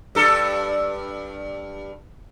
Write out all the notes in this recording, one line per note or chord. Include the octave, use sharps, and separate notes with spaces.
G2 A4